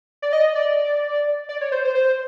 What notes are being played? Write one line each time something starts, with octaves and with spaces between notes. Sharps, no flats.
D5
D#5
D5
D5
C#5
C5
C5
C5